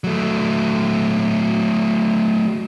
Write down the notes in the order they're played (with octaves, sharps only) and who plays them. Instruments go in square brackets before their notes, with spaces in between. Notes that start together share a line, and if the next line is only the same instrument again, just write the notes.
[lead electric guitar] F#3 A3